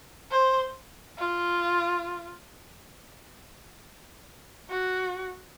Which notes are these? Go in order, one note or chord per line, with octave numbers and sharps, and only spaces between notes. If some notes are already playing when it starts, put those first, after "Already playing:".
C5
F4
F#4